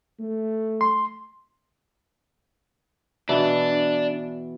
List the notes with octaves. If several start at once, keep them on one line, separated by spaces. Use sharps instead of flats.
A3
C6
B2 E3 B3 D4